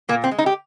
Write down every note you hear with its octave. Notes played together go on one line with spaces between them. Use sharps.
A#2 A#3
C4
G#3
D#4
G4